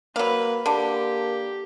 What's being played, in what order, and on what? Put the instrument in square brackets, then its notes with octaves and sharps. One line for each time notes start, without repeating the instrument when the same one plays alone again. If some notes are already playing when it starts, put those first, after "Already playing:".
[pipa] F#3 F5 [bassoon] A#3 [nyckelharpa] B4
[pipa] D3 [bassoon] A#3 [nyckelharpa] G4